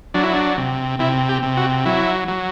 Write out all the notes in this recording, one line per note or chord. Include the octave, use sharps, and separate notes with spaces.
F#3 D4
E4
D4
C3
C3 E4
G4
C3
F#4
F#3 E4
F#3